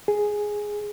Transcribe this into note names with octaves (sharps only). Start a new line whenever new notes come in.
G#4